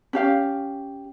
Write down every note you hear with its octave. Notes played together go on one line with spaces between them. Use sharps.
C#4 G4 F5